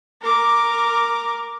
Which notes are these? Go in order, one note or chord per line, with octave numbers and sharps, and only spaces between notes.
A#4 D6